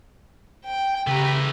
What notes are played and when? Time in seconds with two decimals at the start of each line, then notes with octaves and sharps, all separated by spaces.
0.64 G5
1.07 C#3 A3 G4 B4 A#5